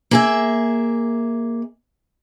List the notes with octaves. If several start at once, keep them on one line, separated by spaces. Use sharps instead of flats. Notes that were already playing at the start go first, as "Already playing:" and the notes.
A#3 G#4 E5